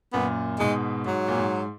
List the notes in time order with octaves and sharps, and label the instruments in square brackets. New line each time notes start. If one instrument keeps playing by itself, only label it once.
[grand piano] F#2 A#2 [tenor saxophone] B3
[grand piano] G#2 B2 [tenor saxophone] G#3
[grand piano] G#2 [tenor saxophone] F#3
[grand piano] A#2
G#2